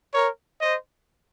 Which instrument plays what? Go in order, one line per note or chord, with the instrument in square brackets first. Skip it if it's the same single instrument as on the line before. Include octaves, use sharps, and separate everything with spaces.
[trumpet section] A#4 C#5
C5 D#5